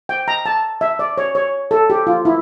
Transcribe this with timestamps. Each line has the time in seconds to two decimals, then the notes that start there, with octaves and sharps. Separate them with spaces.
0.09 G5
0.28 A#5
0.46 A5
0.81 E5
0.99 D5
1.18 C#5
1.35 C#5
1.71 A4
1.90 G4
2.07 F4
2.25 E4